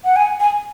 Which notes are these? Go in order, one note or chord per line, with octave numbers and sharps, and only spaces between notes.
F#5
G#5
G#5